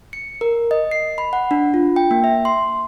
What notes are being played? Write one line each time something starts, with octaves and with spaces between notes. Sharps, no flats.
C#7
A#4
D#5
C7
B5
F#5
D4
F4
G5
A#3
E5
C6